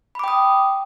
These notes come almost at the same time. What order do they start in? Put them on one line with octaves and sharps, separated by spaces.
B5 D6 G5 D#6